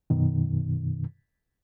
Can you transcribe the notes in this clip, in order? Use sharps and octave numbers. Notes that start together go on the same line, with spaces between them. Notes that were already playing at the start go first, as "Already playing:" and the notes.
F#2 B2 D#3